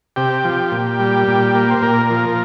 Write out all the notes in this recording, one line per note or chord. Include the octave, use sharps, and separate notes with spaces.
C3 G4
F3
A#2
G3
A#2
A#3
C5
A#2 A#4
F3